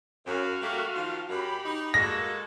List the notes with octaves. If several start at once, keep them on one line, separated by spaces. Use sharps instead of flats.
F#2 F#4 F5
G3 A3 A#3
D#3 F3 F4
F#2 G4 B5
D#4
G#3 A#3 F#4 A4 A#6